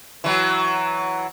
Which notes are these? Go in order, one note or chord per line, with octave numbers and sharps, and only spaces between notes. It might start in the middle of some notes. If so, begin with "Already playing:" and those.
E3 F#3